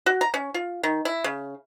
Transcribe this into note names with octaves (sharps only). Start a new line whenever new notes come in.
F#4
A#5
C#4
F4
D#3
E4
C#3